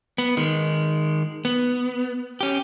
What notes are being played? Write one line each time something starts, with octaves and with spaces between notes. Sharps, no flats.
B3
D#3 G#3
B3
C#4 G4